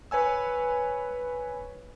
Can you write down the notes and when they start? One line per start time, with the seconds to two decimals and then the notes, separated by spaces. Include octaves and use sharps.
0.11 B4 C#5 G#5 E6